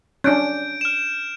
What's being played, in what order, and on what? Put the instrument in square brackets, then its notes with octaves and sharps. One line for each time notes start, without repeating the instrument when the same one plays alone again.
[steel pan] C#4 D4 [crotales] G6 D7
[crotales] F6 E7